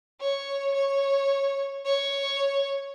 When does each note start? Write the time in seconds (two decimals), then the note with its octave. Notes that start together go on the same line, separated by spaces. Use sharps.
0.20 C#5
0.74 C#5
1.85 C#5